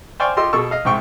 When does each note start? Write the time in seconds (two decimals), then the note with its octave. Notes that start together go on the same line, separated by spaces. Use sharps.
0.20 C5 D5 F5 G5 G#5 C#6
0.37 F4 G4 A4 D#5 C6 E6
0.53 B2 G#4 A4 C#6 E6
0.71 D#5 F5
0.85 C2 G#2 G5 C#6